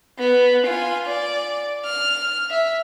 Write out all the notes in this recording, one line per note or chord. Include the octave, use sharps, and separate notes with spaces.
B3
F4 G#5
D5
F6
E5